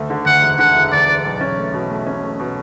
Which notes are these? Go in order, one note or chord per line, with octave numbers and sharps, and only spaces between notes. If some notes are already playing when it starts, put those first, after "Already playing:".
Already playing: D2 A3
D3
D2 F#5
E1
D3 F#5
E1
D2 D5
E1
B1
C#4
A3
B2
A3
C#4
A3
B2